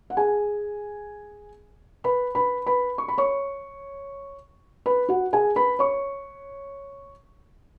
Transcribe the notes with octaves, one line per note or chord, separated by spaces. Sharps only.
F#5
G#4 G#5
B4 B5
B4 B5
B4 B5
C#6
B5
C#5 C#6
B4 B5
F#4 F#5
G#4 G#5
B4 B5
C#5 C#6